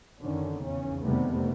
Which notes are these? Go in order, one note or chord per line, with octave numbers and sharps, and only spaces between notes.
F#2 D3 D#3 C#4
E2 C#3 C#4
F2 C3 D#3 G3 A3 B3